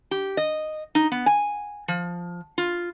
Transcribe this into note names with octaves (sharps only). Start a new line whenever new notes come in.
G4
D#5
D#4
B3
G#5
F3
F4